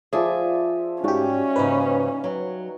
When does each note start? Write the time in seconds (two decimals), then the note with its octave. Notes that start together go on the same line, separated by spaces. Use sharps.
0.13 F3 G#4 D5 E5
1.04 G#2 G3 C#4 F#4 G4 C#6
1.56 G#2 C#3 A#3 D#4 B4
2.24 F#3